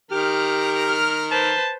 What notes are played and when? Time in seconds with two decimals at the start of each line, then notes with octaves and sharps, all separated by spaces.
0.11 D#3 G4 A#4 F6
0.88 F6
1.31 B4 C5 A5